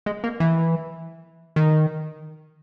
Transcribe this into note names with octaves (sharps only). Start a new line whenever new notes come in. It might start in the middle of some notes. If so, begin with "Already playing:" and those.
G#3
A#3
E3
D#3